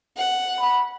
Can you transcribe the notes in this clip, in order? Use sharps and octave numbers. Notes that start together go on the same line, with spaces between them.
F#5
B5